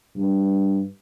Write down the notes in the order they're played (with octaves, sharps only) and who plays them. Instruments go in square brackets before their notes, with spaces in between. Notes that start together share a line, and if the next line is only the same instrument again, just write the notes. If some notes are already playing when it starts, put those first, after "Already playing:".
[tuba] G2